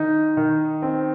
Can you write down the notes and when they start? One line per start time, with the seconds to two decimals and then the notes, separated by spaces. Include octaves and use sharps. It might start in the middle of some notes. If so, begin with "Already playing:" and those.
Already playing: D#3 D#4
0.37 D#3
0.82 C4